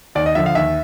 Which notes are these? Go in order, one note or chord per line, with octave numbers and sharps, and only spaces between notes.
D#2 D5
D#5
D3 F3 E5
F5
D#2 E5